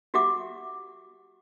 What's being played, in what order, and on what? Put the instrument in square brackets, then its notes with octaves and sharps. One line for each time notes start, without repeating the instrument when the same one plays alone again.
[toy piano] F#4 G4 E5 F#5 D6